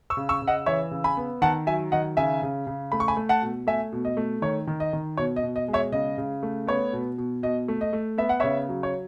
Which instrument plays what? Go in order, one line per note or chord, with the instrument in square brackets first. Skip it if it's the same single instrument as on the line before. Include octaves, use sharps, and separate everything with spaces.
[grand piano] C#6 E6
C#3
C#6 E6
C#3
D#5 F#5
E3 C#5 E5
C#3
G#5 B5
B3
D#3 F#5 A5
F#3 E5 G#5
D#3 D#5 F#5
C#3 E5 G#5
C#3
C#3
A3 B5
C#6
G#5 B5
A3
F#5 A5
B2
A3 E5 G#5
B2
D#5
A3
D#3 C#5
D#3
D#5
D#3
B2 C#5
D#5
B2
D#5
G#3
C#5 E5
C#3 D#5
C#3
A3
B3 C#5
B2
B2
B2 D#5
A3
D#5
A3
B3 E5
F#5
C#3 C#5 E5
F#3
C#5